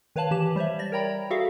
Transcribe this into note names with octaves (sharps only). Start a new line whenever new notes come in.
D#3 B4 C#5 F5 A5 F#7
E3 G4 A5 E7
G3 C5 C#5 E5
D5 A#6
A#4 C#5 G5 A#5 B5
F#4 G#4 A4 E5 F5